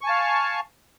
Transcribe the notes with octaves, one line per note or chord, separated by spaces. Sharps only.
F5 G#5 A5 C#6